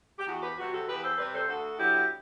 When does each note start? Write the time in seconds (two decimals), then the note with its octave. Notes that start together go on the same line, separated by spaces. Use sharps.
0.19 G4
0.27 E2 F#4
0.42 G4 B4
0.58 C3 G3 C4 F#4
0.72 F#4 A4
0.88 E2 G4 B4
1.03 A4 C5
1.18 C3 G3 C4 B4 D5
1.33 A4 C5
1.48 D2 F#4 A4
1.78 D3 F#3 B3 E4 G4